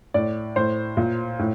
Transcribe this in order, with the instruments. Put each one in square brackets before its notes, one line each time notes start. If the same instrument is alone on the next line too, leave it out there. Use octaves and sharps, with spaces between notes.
[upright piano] A2 D5
A2 C5
A#2
A2